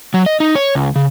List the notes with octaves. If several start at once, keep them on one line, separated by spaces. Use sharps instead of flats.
F#3
D#5
D#4
C#5
C#2
C#3